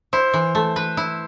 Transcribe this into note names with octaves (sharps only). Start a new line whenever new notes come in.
E4 C5
E3
A3
B4
E4